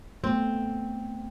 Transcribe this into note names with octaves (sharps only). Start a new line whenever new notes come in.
A3 B3 C4